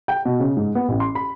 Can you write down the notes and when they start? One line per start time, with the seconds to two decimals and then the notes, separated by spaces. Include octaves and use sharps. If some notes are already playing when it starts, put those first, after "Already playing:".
0.08 G5
0.25 B2
0.40 C#3
0.57 G#2
0.75 B3
0.88 A1
1.00 C6
1.15 B5